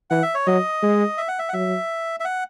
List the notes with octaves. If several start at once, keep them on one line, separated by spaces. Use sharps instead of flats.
E3 F#5
E5
C#5
F#3 D#5
G#3
E5
F#5
E5
F#5
F#3 E5
E5
F#5